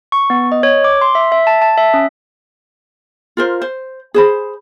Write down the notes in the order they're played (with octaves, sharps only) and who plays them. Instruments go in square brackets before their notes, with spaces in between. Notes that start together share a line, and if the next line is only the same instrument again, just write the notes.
[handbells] C#6
B3
D#5
C#5
D6
C6
E5
E5
A5
A5
E5
C#4
[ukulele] F4 A#4 C5
C5
G#4 C5 B5